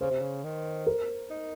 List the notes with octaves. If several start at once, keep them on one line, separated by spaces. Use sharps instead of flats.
C#3 C5
C3
C#3
D#3
A#4
D#4